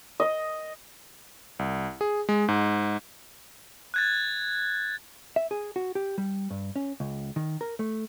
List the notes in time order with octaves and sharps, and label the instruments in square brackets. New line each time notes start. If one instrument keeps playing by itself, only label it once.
[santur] D#5
[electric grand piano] C2
G#4
G#3
G#2
[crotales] F#6 G#6 A6
[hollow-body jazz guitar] E5
G#4
F#4
G4
G3
G2
C#4
C#2
D#3
A#4
A3